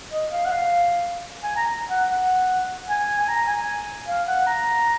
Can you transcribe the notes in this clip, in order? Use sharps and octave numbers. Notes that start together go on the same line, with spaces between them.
D#5
F5
F#5
F5
G#5
A#5
F#5
F#5
G#5
G#5
A#5
G#5
F5
F#5
A#5